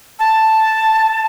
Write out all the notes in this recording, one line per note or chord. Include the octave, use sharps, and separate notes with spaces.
A5